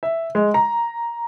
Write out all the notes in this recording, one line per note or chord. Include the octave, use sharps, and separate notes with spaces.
E5
G#3
A#5